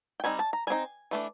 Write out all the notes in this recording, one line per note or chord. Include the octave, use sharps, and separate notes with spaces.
G5
G3 C4 D#4 G#5
A5
A#5
G3 C4 D#4 G#5
E3 A3 D4